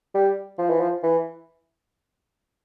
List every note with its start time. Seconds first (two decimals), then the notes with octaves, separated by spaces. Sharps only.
0.15 G3
0.59 F3
0.70 E3
0.81 F3
1.03 E3